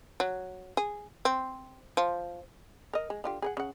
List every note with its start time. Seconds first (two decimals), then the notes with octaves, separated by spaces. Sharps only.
0.20 F#3
0.77 G#4
1.25 C4
1.97 F3
2.93 A#4 D#5
3.10 G#3
3.24 D3 F4 G4
3.42 G#4 A#4 F#5
3.57 C#3 F#5